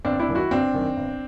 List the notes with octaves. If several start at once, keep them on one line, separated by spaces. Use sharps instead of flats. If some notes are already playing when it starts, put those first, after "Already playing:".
G1 C4 D4
D4 E4
F#2 D#3
E4 F#4
G1 C4 D4
F#2 D#3
G1